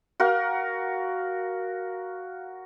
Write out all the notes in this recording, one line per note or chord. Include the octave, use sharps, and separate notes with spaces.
F#4 A#4 F5